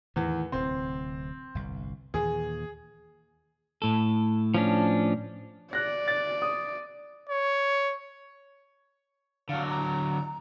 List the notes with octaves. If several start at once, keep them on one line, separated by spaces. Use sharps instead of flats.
E2 A2 D#3
D1 C3 C4
G1 C2
D#2 A#2 E3 G#4
A2 A4
F3 C#4 D4
D5 F#6 A#6
A6
D#6
C#5
D3 F#3 F5
A#5